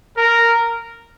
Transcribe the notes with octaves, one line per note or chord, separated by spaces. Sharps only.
A#4